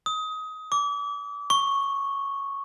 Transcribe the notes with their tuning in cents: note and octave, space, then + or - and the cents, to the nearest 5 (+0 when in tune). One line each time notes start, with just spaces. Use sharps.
D#6 +20
D6 -30
C#6 -5